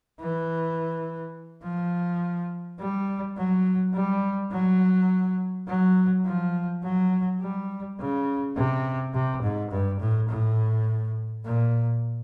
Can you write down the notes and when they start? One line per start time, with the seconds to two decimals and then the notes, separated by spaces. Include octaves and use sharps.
0.20 E3
1.63 F3
2.79 G3
3.37 F#3
3.94 G3
4.52 F#3
5.68 F#3
6.25 F3
6.84 F#3
7.41 G3
7.99 C#3
8.56 C3
9.14 C3
9.43 G#2
9.71 G2
10.00 A2
10.29 A2
11.45 A#2